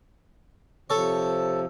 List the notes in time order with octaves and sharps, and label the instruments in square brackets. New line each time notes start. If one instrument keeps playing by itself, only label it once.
[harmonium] C3 F3 [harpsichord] A4 C#5